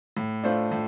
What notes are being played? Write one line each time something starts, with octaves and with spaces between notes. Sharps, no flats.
A2
A3 D4 F4 C5
A2